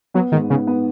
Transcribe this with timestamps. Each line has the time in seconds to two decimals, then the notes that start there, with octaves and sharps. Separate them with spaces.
0.14 F#3 B3
0.32 G#2 D#3
0.50 C#3 B3
0.67 B3